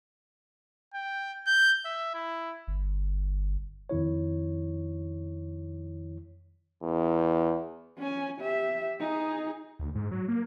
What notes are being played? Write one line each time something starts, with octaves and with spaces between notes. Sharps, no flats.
G5
G6
E5
E4
G1
F2 D#3 E4 C#5
E2
C#4 G#5
G4 E5
D#4 G#4
D2
G#2
F#3
A#3